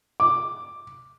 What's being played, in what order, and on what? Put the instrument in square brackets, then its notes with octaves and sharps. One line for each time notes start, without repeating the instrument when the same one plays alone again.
[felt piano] D6